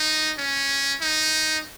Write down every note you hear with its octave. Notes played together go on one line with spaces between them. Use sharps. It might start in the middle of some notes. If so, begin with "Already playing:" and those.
Already playing: D#4
C#4
D#4